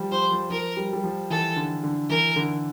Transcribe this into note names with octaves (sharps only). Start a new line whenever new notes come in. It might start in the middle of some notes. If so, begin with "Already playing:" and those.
Already playing: F3 G3
F3 C5
F3
F3 A#4
G3
G3
F3
E3 A4
D3
D3
E3 A#4
D3